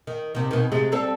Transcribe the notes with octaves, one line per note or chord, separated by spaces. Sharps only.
D#3
C3 D#3
B2 D#3
C3 G#3 A3
G3 C4 A4